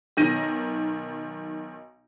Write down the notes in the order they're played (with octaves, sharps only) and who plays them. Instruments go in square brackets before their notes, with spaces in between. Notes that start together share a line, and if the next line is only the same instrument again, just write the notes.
[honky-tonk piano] B1 D#3 A#6 D#7